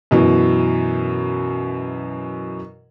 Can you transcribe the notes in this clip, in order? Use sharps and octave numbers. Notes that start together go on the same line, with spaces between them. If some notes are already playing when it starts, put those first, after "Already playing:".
F#2 B2 E3